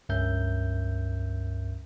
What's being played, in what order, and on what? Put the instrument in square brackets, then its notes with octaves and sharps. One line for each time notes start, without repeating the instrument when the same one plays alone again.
[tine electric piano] C#2 G2 C#4 A#4 E5 G6